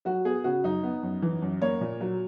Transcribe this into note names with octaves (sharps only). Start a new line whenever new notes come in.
F#3 F#4
B3 G#4
C#3 F#4
F#2 D#4
B3
F#2
E3
F#2
A#3 C#5
A#2
F#3